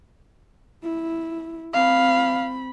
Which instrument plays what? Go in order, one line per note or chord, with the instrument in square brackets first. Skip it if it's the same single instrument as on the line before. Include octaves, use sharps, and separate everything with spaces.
[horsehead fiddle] E4
[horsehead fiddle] C4 B5 [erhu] F5